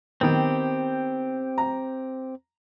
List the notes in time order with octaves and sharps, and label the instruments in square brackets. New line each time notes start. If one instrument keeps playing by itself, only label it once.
[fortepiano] D#3 B3 [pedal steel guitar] C4 G4
[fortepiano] A#5